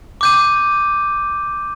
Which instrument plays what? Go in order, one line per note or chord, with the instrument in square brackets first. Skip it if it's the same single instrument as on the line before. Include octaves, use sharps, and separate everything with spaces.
[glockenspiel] D6 G6 D#7